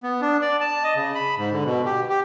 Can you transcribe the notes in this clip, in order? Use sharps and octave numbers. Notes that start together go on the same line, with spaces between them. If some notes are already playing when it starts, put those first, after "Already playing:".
B3
D4
D5
A5
D#5
C#3
B5
G#2
D3
B2
G4
G4